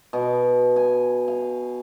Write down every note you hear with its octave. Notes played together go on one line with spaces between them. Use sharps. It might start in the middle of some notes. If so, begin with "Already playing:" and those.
B2
G#5
F5